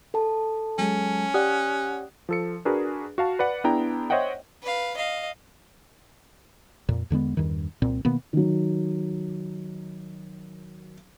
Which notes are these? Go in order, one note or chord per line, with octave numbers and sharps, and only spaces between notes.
A4 A5
F#3 G#3 C#4
G4 D5 F#5 D#6 F#6
F3 A4 C#7
D4 F#4 G#4 A#4 B4
F#4 F5 A5
B4 D5 F#5
B3 D4 E4 G#4 G5 A#5
C5 C#5 D#5 E5 F#5 G5
B4 F5
D#5 F5
F2 A#2
E2 D3 G#3 B3
E2 G2 D#3
C2 A#2 C4
B2 D#3 A#3 B3
D#3 F#3